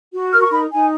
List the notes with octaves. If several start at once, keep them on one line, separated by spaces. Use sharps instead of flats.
F#4
A#4 F6
C#6
D#4 B5
D#4 G#5